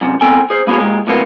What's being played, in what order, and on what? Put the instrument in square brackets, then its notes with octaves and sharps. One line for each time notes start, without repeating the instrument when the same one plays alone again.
[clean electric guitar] F#2 C3
B3 C4 A4 G5 G#5
G#4 C5
A#3 B3 F#4 G#4 C#5
A#2 G#3 G4
A2 C3 F#3 A#3 B3